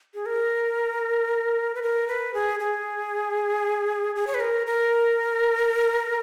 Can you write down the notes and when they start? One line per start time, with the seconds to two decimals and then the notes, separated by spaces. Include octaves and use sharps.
0.14 G#4
0.26 A#4
1.75 B4
1.82 A#4
2.08 B4
2.34 G#4
2.60 G#4
4.16 G#4
4.27 C#5
4.34 B4
4.40 A#4
4.67 A#4